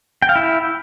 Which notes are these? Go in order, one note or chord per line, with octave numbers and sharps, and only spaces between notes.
G5
F5
E4